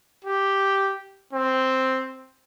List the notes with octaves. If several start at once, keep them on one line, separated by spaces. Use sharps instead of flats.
G4
C4